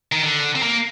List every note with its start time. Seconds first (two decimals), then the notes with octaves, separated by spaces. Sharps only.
0.12 D#3
0.22 D3
0.55 C4
0.63 A#3